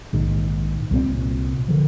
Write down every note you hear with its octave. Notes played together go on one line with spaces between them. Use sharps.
A#1 G#2 D#3
C2 A#2 G#3 C4
D3 F3